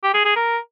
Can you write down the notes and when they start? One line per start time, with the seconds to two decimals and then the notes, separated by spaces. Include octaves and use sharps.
0.03 G4
0.14 G#4
0.25 G#4
0.36 A#4